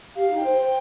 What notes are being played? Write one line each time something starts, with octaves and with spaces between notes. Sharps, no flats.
G4 F5
D#4
G5
C5
C5